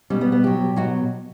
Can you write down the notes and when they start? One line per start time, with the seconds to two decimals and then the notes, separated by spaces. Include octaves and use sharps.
0.10 B2 G3 C#4
0.21 B3
0.32 B3
0.43 B2 F#3 G4
0.76 B2 F#3 F#4